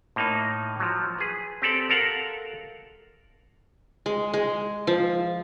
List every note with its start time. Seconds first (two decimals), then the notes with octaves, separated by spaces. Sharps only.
0.16 A2 A#3 D#4
0.80 F3 F#3
1.19 G#4 B4
1.62 C4 G4 A4 D5
1.89 A4 A#4 F5 F#5
4.06 G#3
4.34 G#3
4.87 F3